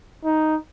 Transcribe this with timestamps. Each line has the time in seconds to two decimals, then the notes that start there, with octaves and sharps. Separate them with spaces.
0.25 D#4